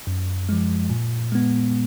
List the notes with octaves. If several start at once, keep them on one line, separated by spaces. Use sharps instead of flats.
F#2
F3 G#3
A#2
G#3 B3